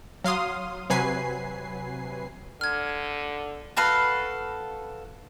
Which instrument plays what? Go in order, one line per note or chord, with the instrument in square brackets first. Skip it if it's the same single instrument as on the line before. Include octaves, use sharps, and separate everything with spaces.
[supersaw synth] F#3 F5 C6 D#6
C3 F#3 B4 G#5 C7
[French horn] D3 [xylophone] F6 G#6
[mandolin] F#4 A4 B4 F5